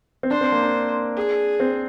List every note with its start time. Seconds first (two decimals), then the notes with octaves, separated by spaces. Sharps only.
0.23 C4
0.31 D4 C5
0.41 C4
0.52 A#3
0.63 D4
1.17 G#4
1.60 C4